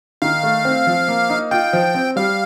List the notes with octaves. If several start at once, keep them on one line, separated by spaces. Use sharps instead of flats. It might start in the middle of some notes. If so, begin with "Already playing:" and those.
D#3 F5
A3
C4
F3
A#3
D#4
F4 G5
F3
C4
G3 F5